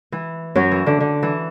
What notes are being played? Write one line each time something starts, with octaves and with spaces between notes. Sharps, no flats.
E3
F#2 F#3
E3
D3
D3
E3